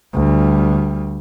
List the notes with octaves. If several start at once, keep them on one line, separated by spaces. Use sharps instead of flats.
D2 G3